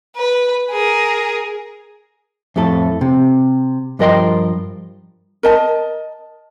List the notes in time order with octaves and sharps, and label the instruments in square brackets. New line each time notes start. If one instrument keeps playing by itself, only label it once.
[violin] B4
G#4 A#4
[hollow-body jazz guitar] F2 A2 A3 A4
C3
G2 F3 A#4 D#5 G5 C6
[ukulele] A#4 D#5 A5